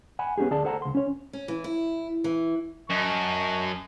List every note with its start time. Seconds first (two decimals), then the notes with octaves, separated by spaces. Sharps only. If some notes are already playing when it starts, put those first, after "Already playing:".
0.19 F#5 G#5 B5
0.38 B3 C#4 D4 G4 G#4
0.51 D2 G#4 D5 A5
0.65 A4 C5 F#5 A5 A#5
0.82 C#2 C6
0.95 C#4 C#5
1.33 C#4
1.48 E3
1.64 E4
2.24 E3
2.90 F#2 D#5 A5 C#6